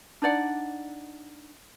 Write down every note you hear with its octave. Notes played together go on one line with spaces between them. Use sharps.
D4 D#4 D5 F#5